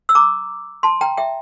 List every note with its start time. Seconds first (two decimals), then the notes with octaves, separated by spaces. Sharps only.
0.09 E6
0.15 A#5 D6
0.83 A5 C6
1.01 G5 A#5
1.17 E5 G5